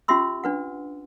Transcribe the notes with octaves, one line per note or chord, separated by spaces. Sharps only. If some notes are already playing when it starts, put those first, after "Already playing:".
C#4 F4 G4 E5 C6 E6
D4 B4 F#5